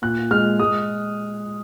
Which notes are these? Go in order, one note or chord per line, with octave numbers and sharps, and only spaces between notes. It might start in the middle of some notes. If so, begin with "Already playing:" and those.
A#2 F#6
G#3 F6
G#3 D#6